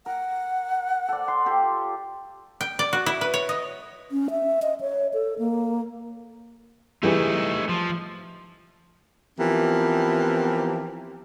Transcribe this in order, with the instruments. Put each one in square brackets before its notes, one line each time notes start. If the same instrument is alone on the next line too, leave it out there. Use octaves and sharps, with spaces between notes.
[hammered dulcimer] A#4 [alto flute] F#5
[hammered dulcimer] A4 D5
C6
F4 G4 A4
[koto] G5
D5
F#4
E4
B4
C#5
D#5
[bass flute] C#4
E5
D#5
C#5
A4
A#3
[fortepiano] E3 G3 G#4 [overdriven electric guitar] A3 D#4
[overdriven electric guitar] F3
[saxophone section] E3 F3 B3 C4 G4 A#4